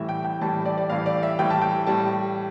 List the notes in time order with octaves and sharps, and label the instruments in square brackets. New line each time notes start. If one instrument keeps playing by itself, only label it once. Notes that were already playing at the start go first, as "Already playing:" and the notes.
Already playing: [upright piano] A2 E3 G3 E5
G5
G5
A2 E3 G3 A5
D5
D5
A2 E3 G3 F5
D5
E5
A2 E3 G3 G5
A5
G5
A2 G3 A5